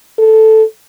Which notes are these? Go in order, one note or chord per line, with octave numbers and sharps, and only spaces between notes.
A4